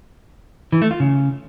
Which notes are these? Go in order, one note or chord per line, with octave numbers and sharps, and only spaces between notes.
E3
A3
F4
C#3